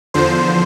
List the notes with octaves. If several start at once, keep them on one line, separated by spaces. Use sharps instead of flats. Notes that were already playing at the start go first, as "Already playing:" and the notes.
E2 D3 F3 C5